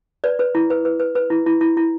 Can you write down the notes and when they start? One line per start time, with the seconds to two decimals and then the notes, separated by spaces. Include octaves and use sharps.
0.24 B4 D5
0.39 B4
0.55 E4
0.70 B4
0.85 B4
1.00 B4
1.15 B4
1.30 E4
1.46 E4
1.61 E4
1.77 E4